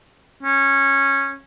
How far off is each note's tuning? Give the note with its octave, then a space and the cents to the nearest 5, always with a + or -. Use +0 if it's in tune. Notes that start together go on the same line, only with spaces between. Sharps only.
C#4 -15